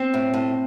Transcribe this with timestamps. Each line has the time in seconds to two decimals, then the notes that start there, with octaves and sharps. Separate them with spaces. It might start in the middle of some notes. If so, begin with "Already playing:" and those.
Already playing: C4
0.14 A2
0.34 A2